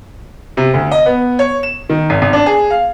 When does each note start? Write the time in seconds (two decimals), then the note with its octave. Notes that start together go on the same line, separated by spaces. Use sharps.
0.57 C3
0.74 D2
0.91 D#5
1.06 B3
1.39 C#5
1.63 E7
1.89 D#3
2.10 G#1
2.22 G#1
2.33 D4
2.46 G#4
2.70 F5